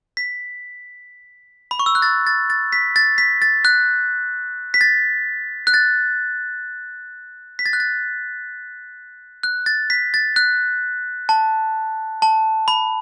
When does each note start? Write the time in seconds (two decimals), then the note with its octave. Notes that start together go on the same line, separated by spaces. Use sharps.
0.17 B6
1.71 B5
1.79 C#6
1.86 E6
1.95 F#6
2.02 A6
2.27 A6
2.50 A6
2.73 B6
2.96 A6
3.18 B6
3.42 A6
3.65 F#6
4.74 B6
4.81 A6
5.67 F#6
5.74 A6
7.59 B6
7.66 A6
7.73 F#6
7.80 A6
9.43 F#6
9.66 A6
9.90 B6
10.14 A6
10.36 F#6
11.29 A5
12.22 A5
12.68 B5